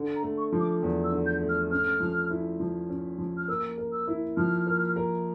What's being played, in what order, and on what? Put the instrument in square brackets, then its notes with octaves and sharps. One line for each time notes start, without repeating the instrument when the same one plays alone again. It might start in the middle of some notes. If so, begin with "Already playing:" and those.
Already playing: [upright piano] D3
[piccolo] A#5
[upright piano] A3
[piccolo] C#6
[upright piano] F3
[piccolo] D6
[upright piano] E2
[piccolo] E6
[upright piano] D3
[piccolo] G6
[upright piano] A3
[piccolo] F6
[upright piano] C#4 [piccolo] F6
[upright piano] F3
E4
F3
C#4
F3
[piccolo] F6
[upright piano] A#3 [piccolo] E6
[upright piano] A#4
[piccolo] E6
[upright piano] E4
[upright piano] F3 [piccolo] F6
[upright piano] A#3
A#4